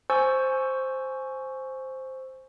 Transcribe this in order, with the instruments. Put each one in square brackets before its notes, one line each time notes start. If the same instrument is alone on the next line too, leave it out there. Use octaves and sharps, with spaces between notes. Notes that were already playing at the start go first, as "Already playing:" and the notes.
[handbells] C5 G#5 C#6 E6 G6 A6